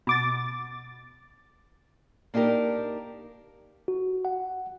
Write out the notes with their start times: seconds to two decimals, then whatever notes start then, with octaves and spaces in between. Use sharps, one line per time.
0.07 B2 D6 A6
2.34 A#3 D4 D#4 G4 A#4
3.88 F#4
4.25 F#5